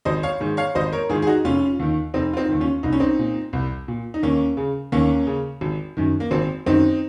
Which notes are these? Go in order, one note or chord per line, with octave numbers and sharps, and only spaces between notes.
G#1 C5 D#5
C#5 F5
G#2 D#3
C#5 F5
G#1 C5 D#5
A#4 C#5
G#2 D#3 F4 G#4
G#4
D#4 F#4
F1 C#4 F4
D#2 D#3
F1 C4 D#4
F4
C4 D#4
D#2 D#3
C#4 F4
C2 D#4
C#4
C4 D#4
A#2
C2
A#2
D#4
D#2 A#3 C#4
C#3
D#2 A#3 C#4
C#3
G#1
F#2 D#3
A#3
G#1 C4
F#2 D#3 C4 D#4